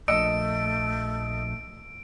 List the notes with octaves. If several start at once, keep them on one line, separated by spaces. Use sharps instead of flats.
A#1 A3 D#5 E6 C#7 D7